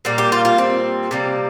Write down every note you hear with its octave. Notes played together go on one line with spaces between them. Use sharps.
A#2 G3 A#3
G4
F4
F4
C4
C3 G3 A#3